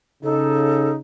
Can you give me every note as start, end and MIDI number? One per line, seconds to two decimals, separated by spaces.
0.23 0.98 49
0.23 0.98 63
0.23 0.90 69